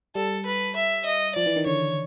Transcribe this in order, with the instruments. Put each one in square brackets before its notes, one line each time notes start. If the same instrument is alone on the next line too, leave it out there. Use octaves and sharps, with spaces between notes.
[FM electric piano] G3 [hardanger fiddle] A4
[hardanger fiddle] B4
E5
D#5
[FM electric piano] F3 [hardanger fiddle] D5
[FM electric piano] E3
D#3
[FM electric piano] D3 [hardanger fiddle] C#5